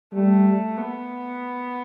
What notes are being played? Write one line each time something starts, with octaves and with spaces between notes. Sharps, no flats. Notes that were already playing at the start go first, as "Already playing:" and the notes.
G3 A3
B3